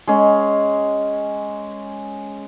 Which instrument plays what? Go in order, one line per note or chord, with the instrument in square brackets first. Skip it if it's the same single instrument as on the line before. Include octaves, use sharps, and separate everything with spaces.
[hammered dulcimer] G#3 C#4